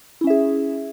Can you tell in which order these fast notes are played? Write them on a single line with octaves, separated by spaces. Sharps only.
E4 C#4 E5 G#4